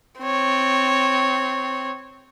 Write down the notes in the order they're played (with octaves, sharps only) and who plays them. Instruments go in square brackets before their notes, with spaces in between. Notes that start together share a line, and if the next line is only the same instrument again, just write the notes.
[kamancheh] C4 C#5